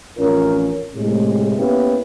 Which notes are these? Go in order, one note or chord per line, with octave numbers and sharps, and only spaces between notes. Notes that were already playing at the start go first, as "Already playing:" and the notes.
A1 F2 C#4 F4 A#4
A2 C3 G#3
A#3 B3 C#4 E4 G4 B4